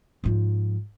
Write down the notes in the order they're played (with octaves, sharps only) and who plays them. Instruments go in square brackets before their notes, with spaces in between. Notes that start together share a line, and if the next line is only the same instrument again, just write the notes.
[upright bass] G#2 F3